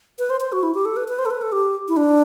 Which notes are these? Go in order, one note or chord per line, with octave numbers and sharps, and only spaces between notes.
B4
C5
C5
F#4
E4
G4
A4
B4
B4
C5
A4
B4
A4
G4
E4
D4